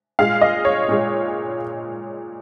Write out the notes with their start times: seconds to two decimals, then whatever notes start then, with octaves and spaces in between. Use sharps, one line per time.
0.19 A#2 G#3 F5
0.41 D#5
0.65 C#5
0.89 A#2 G#3